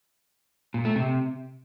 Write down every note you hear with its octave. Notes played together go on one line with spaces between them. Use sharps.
A#2
A3
C3